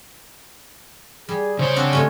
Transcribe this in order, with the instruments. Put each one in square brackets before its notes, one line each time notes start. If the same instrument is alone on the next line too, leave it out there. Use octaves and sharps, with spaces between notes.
[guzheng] G3 [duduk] G#4
[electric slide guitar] C#3 C#5 [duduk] C5
[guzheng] C4 D4 F#4
[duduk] C3 [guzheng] G#3 A3 C#4